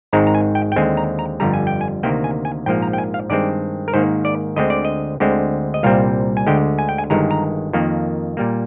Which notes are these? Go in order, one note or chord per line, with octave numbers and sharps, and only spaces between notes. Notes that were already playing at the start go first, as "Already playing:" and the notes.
G#1 G#2 D#3 G#3 C4 A#5
A#5
G#5
G5
G5
D#2 D3 G#3 C4 G#5
A#5
A#5
G1 F2 D3 G3 A#5
G#5
G5
G#5
D2 C3 D#3 A#3 G5
G#5
G#5
A#1 G#2 F3 A#3 G5
A#5
G5
G#5
F5
G2 D#3 G#3 C4 D5
A#4
G#2 D#3 A#3 C5
D5
D2 D3 G#3 C4 D#5
D5
D#5
D2 D3 G#3 C4
D#5
C2 A#2 G3 C4 F5
G#5
D2 D3 G#3 G5
G#5
G5
G#5
G1 G2 D#3 G#3 A#5
A#5
F2 D#3 A#3
A#2 G3 A#3